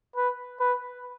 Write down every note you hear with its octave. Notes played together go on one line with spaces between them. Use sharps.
B4
B4